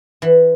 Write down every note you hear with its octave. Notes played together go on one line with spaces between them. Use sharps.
E3